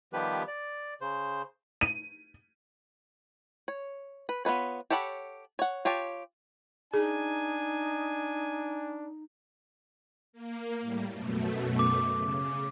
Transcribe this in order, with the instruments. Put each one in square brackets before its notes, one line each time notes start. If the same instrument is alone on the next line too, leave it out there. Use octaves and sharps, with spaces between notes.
[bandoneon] D#3 F3 G3 B3 G4 B4
D5
C#3 C5
[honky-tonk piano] D#7
[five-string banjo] C#5
B4
B3 F4 B4 C#5
G4 A4 C#5 F#5 B5
C#5 F#5
F4 G4 C#5 G5 A5
[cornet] D4 [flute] D#4 [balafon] G#4 [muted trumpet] G#5
[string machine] A#3
A2 G3
F#2 B2 A3
[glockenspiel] D6
[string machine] C#3